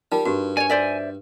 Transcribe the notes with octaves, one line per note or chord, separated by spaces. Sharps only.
G3 D#4 F4 A#4
G2 F#4 G4
C#5 D5 G#5
C5 D5 E5